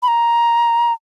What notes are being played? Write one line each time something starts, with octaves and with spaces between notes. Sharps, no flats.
B5
A#5